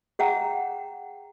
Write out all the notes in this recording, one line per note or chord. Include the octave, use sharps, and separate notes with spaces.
G#4 F#5 G5 A#5